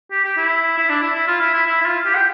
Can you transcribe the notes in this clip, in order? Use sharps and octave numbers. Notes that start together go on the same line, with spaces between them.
G4
G4
E4
E4
D4
E4
E4
F4
E4
E4
E4
E4
F4
G4
G5